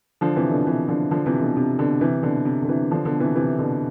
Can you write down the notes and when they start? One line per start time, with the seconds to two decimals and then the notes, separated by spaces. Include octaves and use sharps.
0.21 D3 F3
0.36 C3 E3
0.51 B2 D3
0.67 C3 E3
0.88 D3 F3
1.11 D3 F3
1.26 C3 E3
1.41 B2 D3
1.56 C3
1.78 B2 D3
2.01 C3 E3
2.23 B2 D3
2.45 C3
2.62 D3
2.69 C3 E3
2.91 D3 F3
3.05 B2 D3
3.20 C3 E3
3.36 C3 E3
3.58 B2 D3